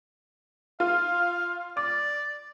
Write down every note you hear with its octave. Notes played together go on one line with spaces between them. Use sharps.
F4 F5
D5 D6